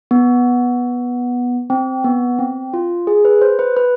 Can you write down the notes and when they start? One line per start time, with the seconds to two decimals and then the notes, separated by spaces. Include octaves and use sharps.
0.11 B3
1.70 C4
2.04 B3
2.39 C4
2.73 F4
3.07 G#4
3.25 B4
3.41 C5
3.59 B4
3.77 B4